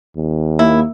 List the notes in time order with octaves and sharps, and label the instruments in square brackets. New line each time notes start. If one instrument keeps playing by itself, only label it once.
[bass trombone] D#2
[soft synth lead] A#3 [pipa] E4